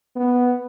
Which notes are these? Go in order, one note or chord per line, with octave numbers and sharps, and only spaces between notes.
B3